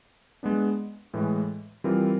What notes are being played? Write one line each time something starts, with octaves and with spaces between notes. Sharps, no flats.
G#3 B3 D4
A2 E3 G#3
E3 G3 C4 F4 A#4